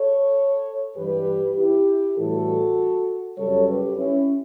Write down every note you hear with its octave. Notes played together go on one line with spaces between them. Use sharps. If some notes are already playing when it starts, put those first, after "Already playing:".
Already playing: A4 C#5
G2 E3 G3 G4 B4
E4 G4
A2 E3 G3 F#4 A4
F#2 C#3 G3 A4 C#5
G4 B4
C#4 E4